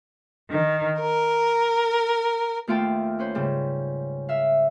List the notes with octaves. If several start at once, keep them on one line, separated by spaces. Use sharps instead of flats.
D#3
A#4
D#2 A3 F4 F5 G5 A5
C#4 B4 C5
G#2 C#3 G3
E5 F5